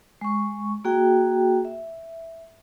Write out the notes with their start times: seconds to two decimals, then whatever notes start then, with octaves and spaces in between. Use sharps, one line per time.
0.21 G#3 C#6
0.84 A#3 F#4 G#4 G5
1.65 E5